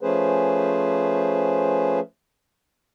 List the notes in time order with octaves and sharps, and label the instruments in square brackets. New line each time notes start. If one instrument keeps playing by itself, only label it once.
[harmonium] F3 A3 C#4 G#4 B4 C5